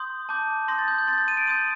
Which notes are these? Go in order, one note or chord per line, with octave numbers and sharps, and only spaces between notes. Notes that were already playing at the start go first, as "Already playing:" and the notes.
Already playing: C6 D#6 G6
A5 D6 G6
C6 D#6 G6 A#6
A6
G6
G6
C6 A6
G6
A6
D#7
D7
C6 D#6 G6 D#7